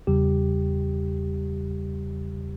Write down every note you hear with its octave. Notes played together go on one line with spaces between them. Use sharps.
E2 C#3 G3 G4